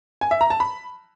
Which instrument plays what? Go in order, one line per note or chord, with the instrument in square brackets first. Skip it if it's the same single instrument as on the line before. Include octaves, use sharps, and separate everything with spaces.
[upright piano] G#5
E5
A#5
A5
B5